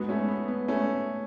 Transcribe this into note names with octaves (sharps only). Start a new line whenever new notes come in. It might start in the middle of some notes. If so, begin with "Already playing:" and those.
Already playing: G#2 F#3 B3
A3 C#4
B3
B3
A3 C#4